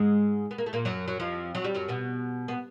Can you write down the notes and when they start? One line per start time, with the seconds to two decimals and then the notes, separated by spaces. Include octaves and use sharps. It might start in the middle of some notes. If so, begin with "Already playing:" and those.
Already playing: G#2 G#3
0.51 B3
0.58 A#3
0.66 A3
0.73 A#2 A#3
0.85 F#2 F#3
1.08 F#3
1.20 F2 F3
1.55 F#3
1.64 G3
1.75 F#2 F#3
1.88 B2 B3
2.48 B3